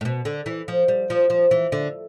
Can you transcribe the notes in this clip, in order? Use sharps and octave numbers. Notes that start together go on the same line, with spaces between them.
A2
B2
D3
E3
F3
G3
F3
F3
E3
D3